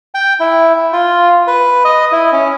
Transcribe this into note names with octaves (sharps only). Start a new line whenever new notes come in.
G5
E4
F4
B4
D#5
E4
C#4